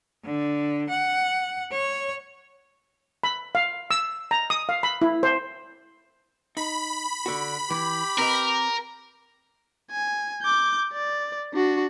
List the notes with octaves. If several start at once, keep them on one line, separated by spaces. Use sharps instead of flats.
D3
F#5
C#5
B5
F5
E6
A#5
D#6
F5
B5
E4
C5
D#4 B5
D3 F#4
E3 G4
C4 A#4 B4 D#5
G#5
D6 G6
D5
D4 F#4